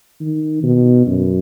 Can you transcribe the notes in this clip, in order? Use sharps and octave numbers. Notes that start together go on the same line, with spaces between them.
D#3
B2
F#2